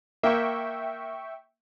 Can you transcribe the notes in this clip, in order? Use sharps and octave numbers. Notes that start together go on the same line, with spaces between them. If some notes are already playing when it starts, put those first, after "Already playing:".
A#3 E5 G5 C#6